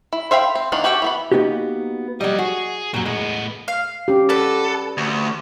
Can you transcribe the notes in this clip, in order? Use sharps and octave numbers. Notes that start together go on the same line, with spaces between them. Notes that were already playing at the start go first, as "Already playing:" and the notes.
E4
C5 E5 F5 G5 B5
C4
D#3 E3 A#3 B3 D4
F#4 G4 A4 B4 G5
E3 B3 B5
A#3 B3 D#4 F#4 G4
F#3 G3 A#3 D#5
F#4 G#4
F#2 A#2 F#3
A2 G#3 B3
F5
C#4 G4
F#4 A4 B4 D5
D2